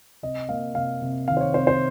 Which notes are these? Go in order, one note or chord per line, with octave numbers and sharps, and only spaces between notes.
C3 D#5
A#3 F5
C3 F5
C3
D#3 F5
C5
C#5
C3 C5
C5